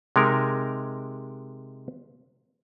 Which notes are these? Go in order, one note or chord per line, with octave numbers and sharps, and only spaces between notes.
C3 G#3 D#4 A#4